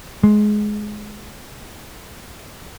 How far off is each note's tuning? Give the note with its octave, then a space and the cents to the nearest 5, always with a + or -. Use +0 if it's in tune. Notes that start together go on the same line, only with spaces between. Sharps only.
G#3 +15